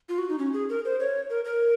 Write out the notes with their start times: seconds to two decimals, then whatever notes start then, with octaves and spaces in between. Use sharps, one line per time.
0.09 F4
0.18 F#4
0.29 D#4
0.39 C#4
0.54 G#4
0.70 A#4
0.85 C5
1.00 C#5
1.30 A#4
1.45 A#4